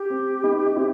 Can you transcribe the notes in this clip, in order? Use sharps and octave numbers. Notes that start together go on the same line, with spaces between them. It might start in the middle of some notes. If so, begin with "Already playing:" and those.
Already playing: G4
C4
B3 D#4
D#4
C4 E4